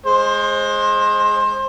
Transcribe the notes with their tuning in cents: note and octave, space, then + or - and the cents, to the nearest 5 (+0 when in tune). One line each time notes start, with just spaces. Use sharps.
G#3 +0 C5 +25